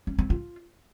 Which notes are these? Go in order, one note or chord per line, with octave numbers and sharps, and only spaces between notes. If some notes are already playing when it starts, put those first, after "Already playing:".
C#4
C4
F4